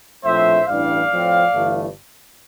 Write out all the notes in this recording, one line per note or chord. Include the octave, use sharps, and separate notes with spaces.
A#1 A2 F3 A3 C4 C5 E5
A1 G2 E3 G3 D4 D5 F5
A2 F3 C4
G1 G2 E3 A3